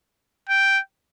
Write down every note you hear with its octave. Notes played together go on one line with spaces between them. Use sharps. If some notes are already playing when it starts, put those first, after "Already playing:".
G5